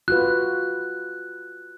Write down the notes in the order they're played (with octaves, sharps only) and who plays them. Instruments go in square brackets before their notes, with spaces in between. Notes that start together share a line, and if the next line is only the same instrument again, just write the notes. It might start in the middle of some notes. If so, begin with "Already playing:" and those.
[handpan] F4 F#4 B4 [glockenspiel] F#6